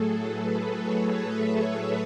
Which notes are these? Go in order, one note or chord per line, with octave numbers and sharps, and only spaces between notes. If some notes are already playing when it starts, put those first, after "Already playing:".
Already playing: A2 F#3 A3 G#4 A4
B4
C#5
E5